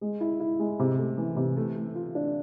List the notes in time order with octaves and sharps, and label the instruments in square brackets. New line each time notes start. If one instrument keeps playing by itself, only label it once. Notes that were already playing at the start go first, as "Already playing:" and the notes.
[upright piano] G#3
E4
E4
G#3
C3
A3
E3
C3
A3
A3
F4
D4